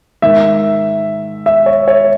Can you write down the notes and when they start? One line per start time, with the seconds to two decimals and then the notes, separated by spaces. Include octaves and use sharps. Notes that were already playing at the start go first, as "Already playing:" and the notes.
0.22 G#2 D#3 E5
1.46 E5
1.66 C#5
1.88 C#5